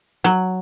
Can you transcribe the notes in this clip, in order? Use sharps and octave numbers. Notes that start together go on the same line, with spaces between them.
F#3